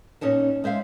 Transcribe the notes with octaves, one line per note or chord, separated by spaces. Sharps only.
A#2 C#4 D#4 C#5 A5
G#3 C5 E5 F5